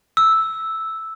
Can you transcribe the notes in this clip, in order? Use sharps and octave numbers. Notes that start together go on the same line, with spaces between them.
E6